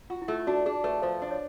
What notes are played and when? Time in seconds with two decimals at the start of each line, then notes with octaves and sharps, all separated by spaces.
0.10 F4 F#4
0.22 E4
0.28 A3 F4
0.40 F4
0.47 D4 F#4
0.66 D4 G#4
0.84 A3 B4
1.02 F3 C5
1.22 D4
1.31 C#5